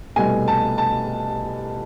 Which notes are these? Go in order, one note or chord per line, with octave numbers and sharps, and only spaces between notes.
C2 B2 A3 G#5
A5
A5